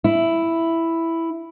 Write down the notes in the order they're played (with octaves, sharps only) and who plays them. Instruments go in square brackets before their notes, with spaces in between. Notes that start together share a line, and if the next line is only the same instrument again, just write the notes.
[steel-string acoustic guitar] E4